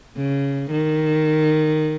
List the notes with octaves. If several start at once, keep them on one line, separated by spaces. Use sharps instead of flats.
C#3
D#3